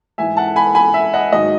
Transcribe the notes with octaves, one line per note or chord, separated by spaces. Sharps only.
G#2 E3 E5 G#5
F#5 A5
G#5 B5
G#5 B5
E5
D#5 F#5
G#2 D#3 F#3 D#5